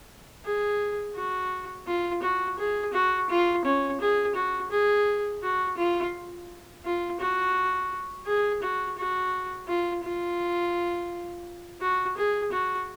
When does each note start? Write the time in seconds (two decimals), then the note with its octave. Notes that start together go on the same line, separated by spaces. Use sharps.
0.45 G#4
1.16 F#4
1.87 F4
2.22 F#4
2.59 G#4
2.93 F#4
3.30 F4
3.65 C#4
4.01 G#4
4.35 F#4
4.71 G#4
5.43 F#4
5.77 F4
6.85 F4
7.20 F#4
8.27 G#4
8.62 F#4
8.98 F#4
9.68 F4
10.04 F4
11.81 F#4
12.17 G#4
12.52 F#4